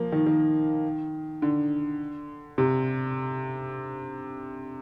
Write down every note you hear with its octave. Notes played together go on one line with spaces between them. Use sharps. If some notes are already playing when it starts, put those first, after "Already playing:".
Already playing: F3 A#3
D#3
D#3
D3
C3